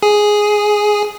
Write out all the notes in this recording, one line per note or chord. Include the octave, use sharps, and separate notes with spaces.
G#4